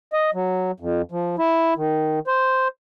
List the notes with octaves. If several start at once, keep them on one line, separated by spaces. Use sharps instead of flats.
D#5
F#3
F2
F3
E4
D#3
C5